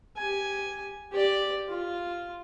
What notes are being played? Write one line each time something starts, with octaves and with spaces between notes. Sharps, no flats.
G4 G#5
G4 D5
F4